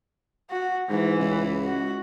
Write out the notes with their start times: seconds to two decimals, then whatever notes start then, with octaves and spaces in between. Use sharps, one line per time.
0.50 F#4
0.90 G#2 E3
1.20 C#2
1.64 F#4